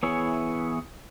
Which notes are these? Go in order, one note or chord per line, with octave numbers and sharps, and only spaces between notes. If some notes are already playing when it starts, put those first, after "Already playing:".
E3 B3 E4 G#4 C#5